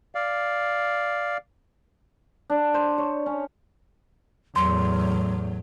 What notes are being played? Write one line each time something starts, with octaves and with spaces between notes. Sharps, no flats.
D5 F5
D4
C5
C#5
C#4
E2 A2 F#3 C6